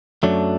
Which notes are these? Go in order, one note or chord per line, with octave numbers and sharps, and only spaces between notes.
F#2 F#3 A3 D4